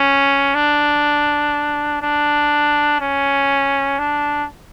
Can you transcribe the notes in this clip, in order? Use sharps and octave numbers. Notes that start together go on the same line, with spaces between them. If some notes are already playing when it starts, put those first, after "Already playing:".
Already playing: C#4
D4
D4
C#4
D4